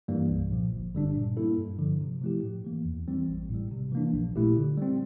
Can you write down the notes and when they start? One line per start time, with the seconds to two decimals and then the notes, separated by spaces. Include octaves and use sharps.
0.08 G2 E3 G3 A#3
0.29 C2
0.51 A#2 F3
0.72 G1
0.94 G2 D3 G3 D4
1.15 A#2
1.37 G3 A#3 E4 A4
1.58 G2
1.79 D3 F3
2.01 C3
2.22 F3 A3 E4 G4
2.43 A2
2.64 E3 A#3
2.85 E2
3.08 E3 G3 C4
3.28 A1
3.49 A2 G3
3.71 C3
3.92 E3 A#3 D4
4.14 A#1
4.36 A#2 A3 E4 G4
4.57 D3
4.78 G3 C4